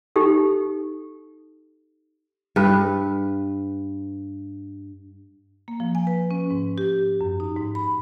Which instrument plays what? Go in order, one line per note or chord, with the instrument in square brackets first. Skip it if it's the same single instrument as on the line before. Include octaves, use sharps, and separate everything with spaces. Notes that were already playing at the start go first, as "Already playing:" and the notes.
[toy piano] D#4 G4 A4
[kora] G2 B4
[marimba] A#3
F3
G#5
B4
C#4
G#2
G4
F#2
D#4
G#2
B5